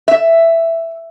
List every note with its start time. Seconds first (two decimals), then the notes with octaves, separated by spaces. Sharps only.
0.08 E5